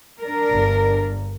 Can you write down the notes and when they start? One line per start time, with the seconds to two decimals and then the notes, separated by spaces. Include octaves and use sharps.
0.22 D4 A#4
0.51 G1